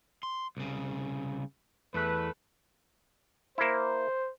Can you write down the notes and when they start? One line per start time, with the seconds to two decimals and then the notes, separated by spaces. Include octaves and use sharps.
0.23 C6
0.57 C2 C#3
1.94 E2 A3 B4
3.58 A#3 E4 C5